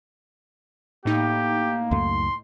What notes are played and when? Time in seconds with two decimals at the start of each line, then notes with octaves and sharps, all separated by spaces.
1.05 A2 A#3 D#4 G4
1.91 C#2 F#2 A3 C6